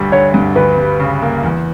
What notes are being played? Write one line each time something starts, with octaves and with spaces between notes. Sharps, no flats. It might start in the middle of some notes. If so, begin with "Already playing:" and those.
Already playing: D2 G2 G3
D3 C#5
G2
D2 B4
G3
C#3
A#3
E2